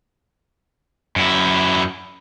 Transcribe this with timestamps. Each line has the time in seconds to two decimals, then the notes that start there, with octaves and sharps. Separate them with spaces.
1.16 F#2 E4